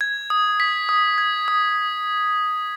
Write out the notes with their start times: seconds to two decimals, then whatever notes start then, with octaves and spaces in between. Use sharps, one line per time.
0.01 G#6
0.30 D#6
0.60 B6
0.89 D#6
1.18 G#6
1.48 D#6